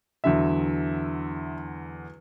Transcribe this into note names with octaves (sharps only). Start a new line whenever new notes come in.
E2 D3 F#3 E5